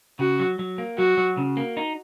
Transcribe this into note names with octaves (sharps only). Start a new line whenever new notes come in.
C#3 F#4
F#3
F#3
A#3
F#3 F#4
F#3
C#3
A#3
D#4